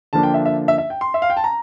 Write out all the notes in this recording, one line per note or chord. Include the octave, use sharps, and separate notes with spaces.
D3 F3 A#3 D4 A5
G5
E5
E5
E5
E5
G5
C6
E5
F5
G5
A5
A#5